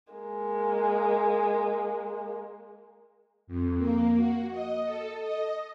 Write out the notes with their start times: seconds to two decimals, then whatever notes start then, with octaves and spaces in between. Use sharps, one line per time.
0.13 G#3 A#3
3.47 F2
3.78 A#3
4.16 F#4
4.51 D#5
4.85 A4
5.20 D#5